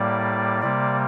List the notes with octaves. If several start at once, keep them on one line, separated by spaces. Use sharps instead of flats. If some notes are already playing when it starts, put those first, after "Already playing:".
Already playing: A2 G3 A#3 D5
C3 G3 A#3 D5